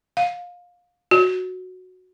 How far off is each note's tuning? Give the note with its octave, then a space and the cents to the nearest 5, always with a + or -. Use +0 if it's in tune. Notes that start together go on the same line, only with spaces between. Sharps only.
F5 +25
F#4 -5